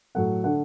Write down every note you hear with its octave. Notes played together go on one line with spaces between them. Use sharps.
A2 F#3 A3 F#5
D3 A3 D4 F#5